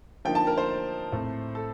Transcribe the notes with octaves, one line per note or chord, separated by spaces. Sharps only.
D3 F3 A#3 D#4 G5
A5
A#4
C5
A2 A3 C4
A4